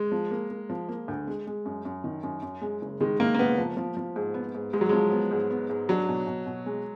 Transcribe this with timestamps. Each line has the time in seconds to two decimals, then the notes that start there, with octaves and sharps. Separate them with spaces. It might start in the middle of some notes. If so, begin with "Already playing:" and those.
Already playing: G#3
0.12 F3
0.31 A#3
0.50 A#3
0.70 F3
0.89 A#3
1.08 D2
1.27 G#3
1.47 G#3
1.65 F#2
1.85 F#2
2.04 D#3
2.23 F#2
2.42 F#2
2.62 G#3
2.81 F#1
3.00 D#3 G#3
3.20 D#3 A#3
3.35 A#3
3.39 F#1 B3
3.58 F3
3.77 F3
3.97 F3
4.16 G#2
4.34 B3
4.54 G#2
4.73 G#2 G#3
4.81 F#3
4.89 F3 G#3
5.11 B3
5.31 G#2
5.50 B3
5.69 G#2
5.89 F#3 D4
6.08 B2
6.27 B2
6.46 B2
6.66 G#3